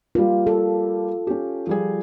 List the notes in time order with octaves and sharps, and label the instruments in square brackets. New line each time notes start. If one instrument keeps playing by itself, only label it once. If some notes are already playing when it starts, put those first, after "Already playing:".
[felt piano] G3 A#3 [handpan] F4
[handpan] A4
[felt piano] C#4 G4
F3 G3 G#4